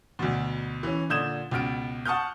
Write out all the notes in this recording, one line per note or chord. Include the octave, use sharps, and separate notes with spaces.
D2 B2
E3 C#4
A#2 D3 D#6 G6 G#6 E7
C#2 B2 F6 D7
F#5 A5 C#6 D#6 F6 G6